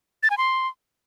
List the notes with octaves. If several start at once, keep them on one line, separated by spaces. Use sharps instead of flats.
A6
G#5
C6